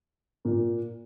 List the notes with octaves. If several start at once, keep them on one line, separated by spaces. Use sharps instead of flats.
A#2 A#3